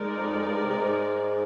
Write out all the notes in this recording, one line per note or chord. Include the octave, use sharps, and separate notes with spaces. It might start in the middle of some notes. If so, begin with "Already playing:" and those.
Already playing: G#3 D#4 A#4 D5
F2
F2
G2
C3
G#2